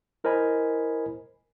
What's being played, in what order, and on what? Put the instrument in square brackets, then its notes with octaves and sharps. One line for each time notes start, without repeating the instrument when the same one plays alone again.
[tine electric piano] E4 A#4 C5 D#5 G#5 B5